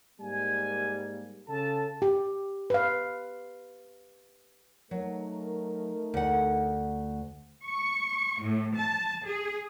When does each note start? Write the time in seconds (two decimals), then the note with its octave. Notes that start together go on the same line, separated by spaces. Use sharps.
0.20 G#2 G3 A#3 G#5
1.47 C#3 A4 A5
2.02 G4
2.70 B4 F5
4.91 F#3 A3 D#4 A#4
6.14 D2 F#5
7.64 C#6
8.42 A2
8.76 A5
9.26 G#4